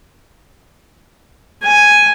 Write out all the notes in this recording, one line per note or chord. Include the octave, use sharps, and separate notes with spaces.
G#5